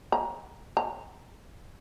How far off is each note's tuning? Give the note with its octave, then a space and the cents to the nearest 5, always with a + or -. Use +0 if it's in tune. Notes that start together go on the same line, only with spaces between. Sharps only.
A#5 +20
A#5 -25